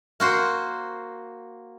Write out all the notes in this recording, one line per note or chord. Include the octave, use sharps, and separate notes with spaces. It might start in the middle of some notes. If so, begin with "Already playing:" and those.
A#3 F#4 C5